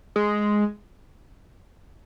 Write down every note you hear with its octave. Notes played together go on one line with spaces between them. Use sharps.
G#3